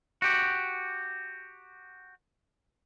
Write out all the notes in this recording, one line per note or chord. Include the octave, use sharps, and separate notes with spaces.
F#4 G4